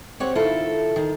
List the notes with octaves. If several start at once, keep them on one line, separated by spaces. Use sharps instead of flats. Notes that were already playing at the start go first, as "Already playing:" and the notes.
C4 G4 C#5 F#5
D#3 E4 F4 A4
D#3